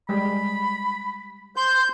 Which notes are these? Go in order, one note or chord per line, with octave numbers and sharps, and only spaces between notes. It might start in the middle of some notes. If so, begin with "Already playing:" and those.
G3 G#3 B5
C5 C6 G6